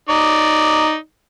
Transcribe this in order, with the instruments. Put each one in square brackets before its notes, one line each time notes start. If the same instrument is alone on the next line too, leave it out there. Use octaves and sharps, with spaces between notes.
[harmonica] D#4 D5